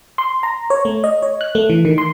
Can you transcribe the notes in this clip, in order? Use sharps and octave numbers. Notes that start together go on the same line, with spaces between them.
C6
A#5
C#5
A3
D#5
C#5
F#6
A3
E3
D#3
C6